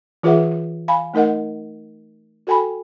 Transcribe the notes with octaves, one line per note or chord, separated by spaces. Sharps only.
E3 F4 G#4 B4 E5 F#5
F5 G#5 B5
A3 D#4 A#4 D#5 F#5
F#4 A4 G5 G#5 B5